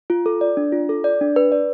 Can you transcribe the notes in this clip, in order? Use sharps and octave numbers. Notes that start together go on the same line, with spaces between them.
F4
A4
D5
D4
F4
A4
D5
D4
B4
D5